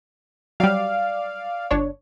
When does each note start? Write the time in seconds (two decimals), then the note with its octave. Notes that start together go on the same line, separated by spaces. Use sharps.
0.60 F#3 G3 D5 F5
1.71 G1 D4 C#5